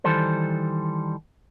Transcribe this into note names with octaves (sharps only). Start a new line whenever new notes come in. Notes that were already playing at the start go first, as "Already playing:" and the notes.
D#3 E3 G3 A4 C5